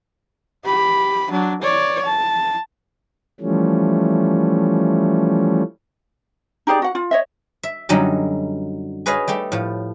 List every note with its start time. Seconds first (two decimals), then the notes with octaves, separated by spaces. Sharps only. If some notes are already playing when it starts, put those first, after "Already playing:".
0.65 G4 B5
1.31 F#3 D4
1.62 C#5 D5
2.06 A5
3.41 E3 F3 G3 A3 C#4
6.67 D#4 G4 G#4 D5
6.82 F#4 F#5
6.95 F4
7.11 C#5 D#5 E5
7.63 E5
7.89 F#2 D3 F#3 G3 D#4 A4
9.06 G#4 B4 C#5 D#5 F5
9.28 G3 A3 G4 A4
9.52 A2 F3